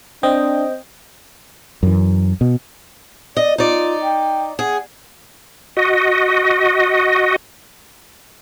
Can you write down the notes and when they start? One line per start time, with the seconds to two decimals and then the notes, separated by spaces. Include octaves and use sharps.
0.23 C4 D4 D#5 G5
1.83 F#2 E3
2.41 B2
3.37 D5 D#5
3.58 D#4 F4 D5
4.03 G5
4.59 G#4 F#5
5.77 F#4 D#5